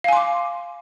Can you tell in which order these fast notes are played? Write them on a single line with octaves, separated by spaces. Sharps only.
F5 G#5 C6 D6